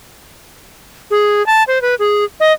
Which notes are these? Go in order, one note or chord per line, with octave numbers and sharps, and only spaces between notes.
G#4
A5
C5
B4
G#4
D#5